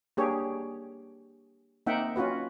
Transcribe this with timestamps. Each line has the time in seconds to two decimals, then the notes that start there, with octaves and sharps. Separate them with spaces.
0.17 A#3 D4 G4 G#4 C#5
1.87 A#3 C4 D#4 E5 F#5 G5
2.16 C#4 F4 F#4 B4